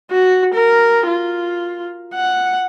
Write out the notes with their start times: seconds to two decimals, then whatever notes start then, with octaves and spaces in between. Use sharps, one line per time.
0.11 F#4
0.55 A#4
1.07 F4
2.14 F#5